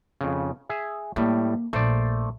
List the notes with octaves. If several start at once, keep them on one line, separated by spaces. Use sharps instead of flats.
F2 C#3
G#4 E5
A2 G3 A#3
A#1 A3 C5 D5